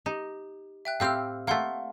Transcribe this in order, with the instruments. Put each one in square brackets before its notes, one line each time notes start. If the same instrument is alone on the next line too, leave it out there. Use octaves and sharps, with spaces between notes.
[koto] D#4 [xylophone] G4
[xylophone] E5 G5 F#6
[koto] A2 C4 G4 [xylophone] F5 E6 F6
[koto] A3 A#3 [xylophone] F5 F#5 C6